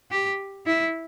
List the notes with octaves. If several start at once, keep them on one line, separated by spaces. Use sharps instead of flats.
G4
E4